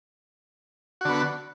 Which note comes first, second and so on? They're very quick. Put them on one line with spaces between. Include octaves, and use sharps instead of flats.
F#4 D3 B3